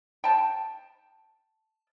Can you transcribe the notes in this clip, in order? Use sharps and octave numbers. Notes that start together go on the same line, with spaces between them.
G5 A5